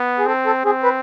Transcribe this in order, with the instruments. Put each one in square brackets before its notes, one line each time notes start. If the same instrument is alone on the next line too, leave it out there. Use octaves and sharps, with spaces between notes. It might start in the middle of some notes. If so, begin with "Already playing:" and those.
Already playing: [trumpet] B3
[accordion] G#4
[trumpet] C4 [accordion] A4
[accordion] A4
[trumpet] C4 [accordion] G#4
[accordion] B4